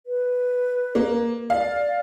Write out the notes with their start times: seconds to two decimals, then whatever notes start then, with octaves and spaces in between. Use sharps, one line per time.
0.06 B4
0.95 A#3
1.50 D5 F5